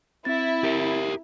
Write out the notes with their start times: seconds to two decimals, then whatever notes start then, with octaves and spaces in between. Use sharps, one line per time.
0.25 C4 E4 A6
0.64 G4 A#4